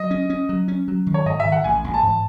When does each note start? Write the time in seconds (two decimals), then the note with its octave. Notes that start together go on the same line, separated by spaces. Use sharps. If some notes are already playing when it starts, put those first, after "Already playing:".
Already playing: F#3 D#5
0.11 C#4
0.30 C#4
0.49 F#3
0.68 C#4
0.88 F#3
1.07 D#3
1.14 C#5
1.26 G#2 D#5
1.40 E5
1.45 D#3
1.52 F#5
1.64 A1 G#5
1.84 A1
1.94 A5
2.03 G#2